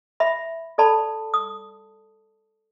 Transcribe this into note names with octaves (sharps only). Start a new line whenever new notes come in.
E5 B5
A4 D5 A5 B5
D#6